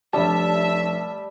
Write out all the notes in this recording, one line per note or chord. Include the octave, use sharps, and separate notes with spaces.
F1 G3 D4 C#5 E5 A5